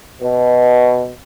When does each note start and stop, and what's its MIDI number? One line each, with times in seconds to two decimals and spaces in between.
0.22 1.10 47